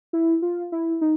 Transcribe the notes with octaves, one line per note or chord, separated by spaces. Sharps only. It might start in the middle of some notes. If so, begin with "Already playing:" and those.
E4
F4
E4
D#4